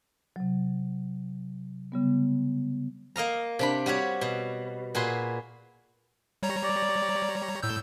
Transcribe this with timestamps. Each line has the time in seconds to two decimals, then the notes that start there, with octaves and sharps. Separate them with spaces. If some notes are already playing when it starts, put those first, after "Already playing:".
0.36 C3 F#3
1.92 C#3 G3 B3
3.16 A#3 D#5 F5 A#5
3.59 C3 D4 B5
3.86 G3 F#4 G4 C#5
4.21 B2
4.95 A#2 F#4 G#4 B4 C6
6.43 G3 C#5 A#5
6.64 D5
7.63 A2 E6 G6